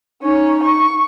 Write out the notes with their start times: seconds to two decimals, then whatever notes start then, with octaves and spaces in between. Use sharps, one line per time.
0.22 C#4 D#4 C#5
0.63 C#6